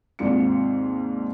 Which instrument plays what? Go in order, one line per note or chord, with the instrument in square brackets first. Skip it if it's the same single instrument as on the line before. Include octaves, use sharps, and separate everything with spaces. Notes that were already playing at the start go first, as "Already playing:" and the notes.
[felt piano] D#2 G#2 C3 F4 D5 C#7